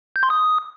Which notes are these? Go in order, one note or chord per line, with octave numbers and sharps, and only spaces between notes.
G6
C6
D#6